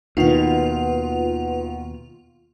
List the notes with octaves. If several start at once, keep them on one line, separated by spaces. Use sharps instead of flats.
D#2 B2 D#3 F4 B4 F#5 F7